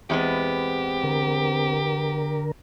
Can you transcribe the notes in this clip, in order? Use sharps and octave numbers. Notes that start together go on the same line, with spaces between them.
E2 G#3 B3 C4 G4
D3 A#4